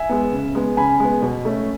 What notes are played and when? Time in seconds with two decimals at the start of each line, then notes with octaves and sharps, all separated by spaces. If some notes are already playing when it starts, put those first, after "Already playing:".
Already playing: E5 G#5
0.09 G#3 B3
0.32 C#3
0.55 G#3 B3
0.77 C#3 G#5 B5
1.00 G#3 B3
1.22 B2
1.45 A3 C#4